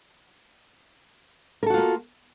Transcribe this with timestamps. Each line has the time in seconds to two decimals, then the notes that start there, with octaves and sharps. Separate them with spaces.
1.63 A#4
1.66 A4
1.70 F#4
1.74 F4
1.78 A#3